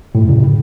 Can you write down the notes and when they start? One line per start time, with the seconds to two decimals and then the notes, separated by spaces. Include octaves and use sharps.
0.15 A2
0.22 F#2
0.29 C#3